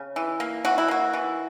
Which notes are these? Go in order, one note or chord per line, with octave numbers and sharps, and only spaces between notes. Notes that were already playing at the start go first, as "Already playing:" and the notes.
Already playing: C#3
E3
A#3
E3 F#4
E4
A#3 F#4
E3